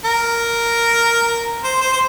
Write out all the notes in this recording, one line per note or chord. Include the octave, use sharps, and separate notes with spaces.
A#4
C5
C5
C5